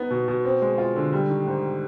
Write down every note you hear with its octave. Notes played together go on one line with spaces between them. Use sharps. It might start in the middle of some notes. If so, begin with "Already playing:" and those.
Already playing: B3 D#4
B2
B2
C4
G#3
F4
D3
G3
D#3
G#2